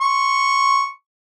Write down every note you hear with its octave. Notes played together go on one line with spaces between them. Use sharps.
C6 C#6